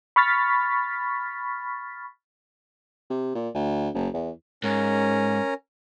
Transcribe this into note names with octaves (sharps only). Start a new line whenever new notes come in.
B5 C#6 F6 A6 B6
C3
A#2
D2
F#1
E2
G#2 C#4 A#4